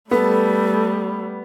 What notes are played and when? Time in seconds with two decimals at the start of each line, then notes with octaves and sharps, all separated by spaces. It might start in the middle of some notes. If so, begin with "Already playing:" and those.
0.11 G3 A3 B3 A4